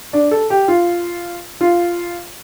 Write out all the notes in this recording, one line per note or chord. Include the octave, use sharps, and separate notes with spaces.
D4
A4
G4
F4
F4